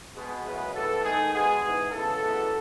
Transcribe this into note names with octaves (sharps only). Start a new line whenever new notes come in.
B2 G#3 B3
F#2 C#3 E3 G#3 B3 B4
A2 E3 B3 A4
G#2 D#3 A3 G#4
B2 G#3 B3 G#4
G#2 E3 G#3 B3
C#3 E3 G#3 B3 A4
F#2 E3 G#3 B3